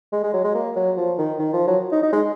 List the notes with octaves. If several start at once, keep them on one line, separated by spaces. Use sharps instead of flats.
G#3
G#3
F#3
G#3
A#3
F#3
F3
D#3
D#3
F3
F#3
D#4
D#4
G#3